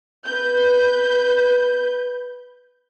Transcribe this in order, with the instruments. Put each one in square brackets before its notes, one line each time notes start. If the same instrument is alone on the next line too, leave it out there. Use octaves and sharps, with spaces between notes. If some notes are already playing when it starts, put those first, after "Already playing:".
[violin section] B4 G6